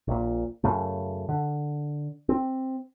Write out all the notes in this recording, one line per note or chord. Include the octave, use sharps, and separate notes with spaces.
A#1 A#2
F#2 C#3 A3
D3
C4